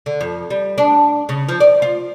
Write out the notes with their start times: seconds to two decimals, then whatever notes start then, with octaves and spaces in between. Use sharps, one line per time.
0.06 D3
0.21 F2
0.50 G3
0.78 D4
1.29 C#3
1.49 F3
1.60 D5
1.82 F4